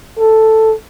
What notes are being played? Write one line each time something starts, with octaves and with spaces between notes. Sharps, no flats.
A4